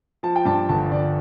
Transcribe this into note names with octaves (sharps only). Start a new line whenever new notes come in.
F3 A5
G5
G2 A5
G1 A5
G1 D5